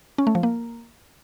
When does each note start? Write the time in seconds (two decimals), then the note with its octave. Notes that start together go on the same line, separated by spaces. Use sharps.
0.18 C#4
0.27 A3
0.35 F3
0.43 A#3